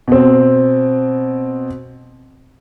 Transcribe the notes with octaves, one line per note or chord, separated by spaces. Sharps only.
B2 C4